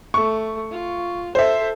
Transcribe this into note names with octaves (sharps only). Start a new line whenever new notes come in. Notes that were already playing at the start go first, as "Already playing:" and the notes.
A3 C#6
F4
A4 C5 E5